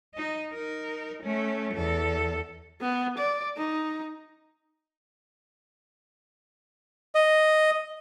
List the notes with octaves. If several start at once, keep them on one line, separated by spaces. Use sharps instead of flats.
D#4 D#5
D#4 A#4
A3 C#4
E2 A4
B3
D5
D#4
D#5